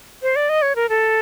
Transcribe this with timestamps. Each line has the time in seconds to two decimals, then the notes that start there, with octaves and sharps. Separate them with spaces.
0.22 C5
0.36 D5
0.49 D#5
0.62 C#5
0.76 A#4
0.89 A4